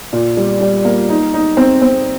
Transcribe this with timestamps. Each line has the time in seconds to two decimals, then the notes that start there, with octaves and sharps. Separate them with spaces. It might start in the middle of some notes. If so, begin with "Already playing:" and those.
0.13 A#2
0.37 G3
0.60 G3
0.85 A#3
1.09 D#4
1.34 D#4
1.57 C4
1.82 C4